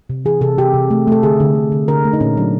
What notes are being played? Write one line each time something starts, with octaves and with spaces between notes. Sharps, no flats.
C3
E3 G#4
C3 A4
C3 G4
C3
A3
A3 A4
D3 G#4
D3
D3
D3
D3 A#4
A3
D#4
A#2 C#4
F#3 D4